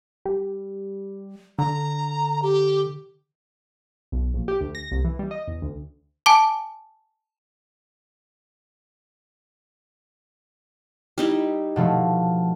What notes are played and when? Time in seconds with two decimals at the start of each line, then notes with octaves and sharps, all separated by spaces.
0.25 G3
1.59 D3 A#5
2.43 G4
4.12 B1
4.34 A#1
4.48 G4
4.61 D2
4.75 A#6
4.91 C2
5.05 E3
5.19 G3
5.31 D#5
5.47 E2
5.62 D2
6.26 G#5 A5 D6
11.18 G3 D#4 E4
11.76 B2 F3 A3